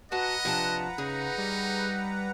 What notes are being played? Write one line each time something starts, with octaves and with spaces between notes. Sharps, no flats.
F#4 B4 D#5 F#5 A5 A#5
C3 F3 D4 A5
C#3 D#4 G#4
G3